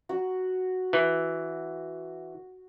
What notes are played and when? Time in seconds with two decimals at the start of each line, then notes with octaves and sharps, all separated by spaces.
0.09 F#4
0.93 E3